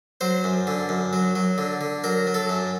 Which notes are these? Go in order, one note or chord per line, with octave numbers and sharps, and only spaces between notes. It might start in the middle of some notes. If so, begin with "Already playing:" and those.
F#3 C5
F#2
D3
F#2
F#3
F#3
D3
D3
F#3 A#4
F#3
A4
F#2